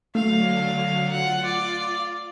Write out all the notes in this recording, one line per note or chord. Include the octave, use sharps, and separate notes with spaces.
D3 F#3 A3 F5
F4 F#5
D5